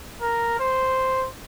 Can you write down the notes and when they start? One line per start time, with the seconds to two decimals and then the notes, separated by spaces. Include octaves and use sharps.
0.21 A#4
0.60 C5